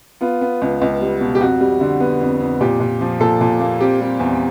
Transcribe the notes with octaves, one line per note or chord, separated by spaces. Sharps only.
B3 F4
B3
C#2
C#2
G3
B2
G4
F2 F#4
G3
D3
B3
F2
F2
A#2 G4
A#2
F3
A#2 A4
A#2
A#3
C4 G4
G3
E2